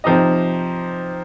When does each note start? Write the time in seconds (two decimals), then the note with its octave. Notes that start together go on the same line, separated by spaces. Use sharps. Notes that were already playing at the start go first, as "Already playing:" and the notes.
0.04 C3 F3 D#4 G4 D#5